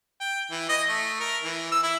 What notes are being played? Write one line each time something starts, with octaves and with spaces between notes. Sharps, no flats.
G5
E3
D#5
A3
A#4
E3
E6
E4